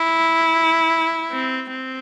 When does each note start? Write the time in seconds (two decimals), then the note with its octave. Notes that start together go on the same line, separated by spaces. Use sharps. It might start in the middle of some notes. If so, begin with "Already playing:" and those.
Already playing: E4
1.32 C4
1.71 C4